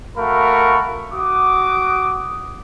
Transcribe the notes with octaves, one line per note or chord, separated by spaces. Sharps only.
A3 F#4 A#4 F5 B5 C#6
F#4 D6 D#6